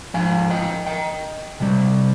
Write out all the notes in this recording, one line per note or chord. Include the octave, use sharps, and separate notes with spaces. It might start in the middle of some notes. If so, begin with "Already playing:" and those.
G#2 F3 F5 G#5
D#5 G5
D#5 G5
C3 G3